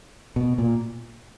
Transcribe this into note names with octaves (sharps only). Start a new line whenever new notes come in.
B2
A#2